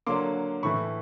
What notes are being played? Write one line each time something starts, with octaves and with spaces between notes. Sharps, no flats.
D3 F#3 A#3 C6 D6
A2 E3 A3 B5 C#6